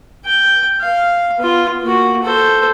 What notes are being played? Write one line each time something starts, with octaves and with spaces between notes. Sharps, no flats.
G5
F5
B3 F4
A#3 F#4
A4 C5